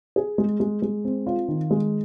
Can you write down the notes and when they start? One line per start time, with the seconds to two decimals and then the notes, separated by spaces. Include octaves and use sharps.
0.16 G#4
0.38 G#3
0.60 G#3
0.82 G#3
1.05 C4
1.27 F4
1.48 D#3
1.71 G#3